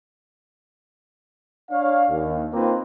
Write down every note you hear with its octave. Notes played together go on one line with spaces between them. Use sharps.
D4 C#5 F5
D#2
A#3 C4 D#4 F4 B4 C5